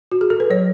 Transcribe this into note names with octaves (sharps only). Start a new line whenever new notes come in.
F#4
G#4
A4
B4
F#3 C#5